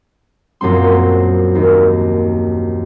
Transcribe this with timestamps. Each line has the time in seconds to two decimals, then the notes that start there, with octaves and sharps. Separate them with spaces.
0.61 A#1 F#2 A#3 C4 C6
1.55 D#2